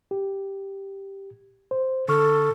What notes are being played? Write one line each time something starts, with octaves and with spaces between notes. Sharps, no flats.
G4
C5
D3 A4 C#6 F6